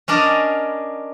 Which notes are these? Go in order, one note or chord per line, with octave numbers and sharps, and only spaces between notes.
C#4 D4 A#4 D5 D#5 A#5